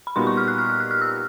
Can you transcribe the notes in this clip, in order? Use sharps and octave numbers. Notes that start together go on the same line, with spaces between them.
B5
A#2 G3 B3 D#4 F#4 C6
C#6
F6
F#6
F6
F6
F#6
F6
E6